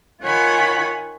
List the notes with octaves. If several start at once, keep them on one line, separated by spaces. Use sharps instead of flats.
D#3 F4 C#5 F#5 G#5 B5